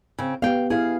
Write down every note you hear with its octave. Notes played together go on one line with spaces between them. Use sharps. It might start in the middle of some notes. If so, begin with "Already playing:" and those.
C#3 C4
B3 G4 F5 G5
E4 G#4 F5